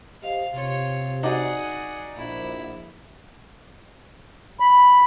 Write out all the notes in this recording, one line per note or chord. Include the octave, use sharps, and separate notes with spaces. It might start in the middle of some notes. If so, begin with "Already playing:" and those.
G4 C5 D#5 F5
C3 F4 C#5
D#4 F#4 G#4 D5 F#5
A#1 E4
B5